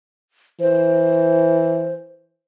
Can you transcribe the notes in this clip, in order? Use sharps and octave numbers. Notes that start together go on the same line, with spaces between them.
E3 C5